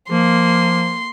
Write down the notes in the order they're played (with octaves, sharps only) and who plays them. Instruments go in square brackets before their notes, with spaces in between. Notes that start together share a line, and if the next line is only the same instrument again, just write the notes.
[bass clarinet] F3 [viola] A#3 [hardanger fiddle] C6